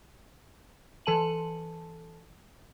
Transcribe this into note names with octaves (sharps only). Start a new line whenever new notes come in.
E3 A4 A5 D#7 F#7